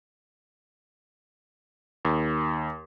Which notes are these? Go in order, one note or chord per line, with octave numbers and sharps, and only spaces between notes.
D#2